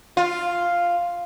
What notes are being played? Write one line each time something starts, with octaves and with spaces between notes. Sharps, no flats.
F4